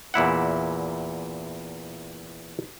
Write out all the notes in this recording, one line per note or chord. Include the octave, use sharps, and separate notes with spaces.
E2 A#2 E4 F#5